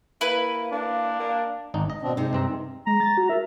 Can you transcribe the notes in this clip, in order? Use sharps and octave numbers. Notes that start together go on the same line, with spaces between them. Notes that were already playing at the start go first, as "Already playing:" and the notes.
A#3 E4 B4
A#3 D4
A#3
G#1 D4 D#4
D#5
B2 C4 D4
C3 G#3 D#4
G2 C4 A#5
G#3 A#5
A6
F#4
A#4 E5